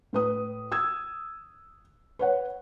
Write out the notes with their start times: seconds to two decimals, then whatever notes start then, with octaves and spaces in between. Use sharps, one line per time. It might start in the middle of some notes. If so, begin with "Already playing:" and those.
0.13 A2 B4 D#6
0.72 D#6 E6 G#6
2.19 B4 C#5 F#5